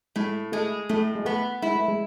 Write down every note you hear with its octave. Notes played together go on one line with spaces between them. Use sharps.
A2 G#3
G#3 A3
A2 A3
G#3
A3 B3
G#3 E4
A3
G#3